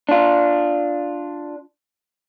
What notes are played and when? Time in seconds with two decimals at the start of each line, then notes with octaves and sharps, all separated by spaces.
0.09 D4 F4